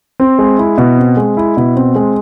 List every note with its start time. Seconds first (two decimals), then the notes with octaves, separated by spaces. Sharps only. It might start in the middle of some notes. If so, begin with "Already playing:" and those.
0.20 C4
0.39 G#3
0.59 E4
0.78 B2
0.97 C4
1.17 G#3
1.37 E4
1.57 B2
1.76 C4
1.96 G#3